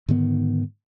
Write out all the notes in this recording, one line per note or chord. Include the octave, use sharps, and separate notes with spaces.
G#2 D3 D#3 B3